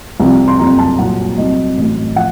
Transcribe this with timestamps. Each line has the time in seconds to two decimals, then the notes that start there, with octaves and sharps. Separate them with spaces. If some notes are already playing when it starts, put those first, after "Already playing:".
0.20 C2 C3 F3
0.48 C6
0.59 F#1 F2 C3 A#5
0.79 A5
0.99 C2 A#2 F#3 F#5
1.37 C2 C3 F#3 D#5
1.77 A1 A2 F#3
2.16 F3 F#5